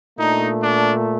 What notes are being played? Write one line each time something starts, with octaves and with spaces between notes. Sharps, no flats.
A#2 A3 D4 D#4
D4